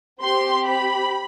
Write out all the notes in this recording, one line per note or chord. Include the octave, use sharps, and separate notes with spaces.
C4 G4 C6
B5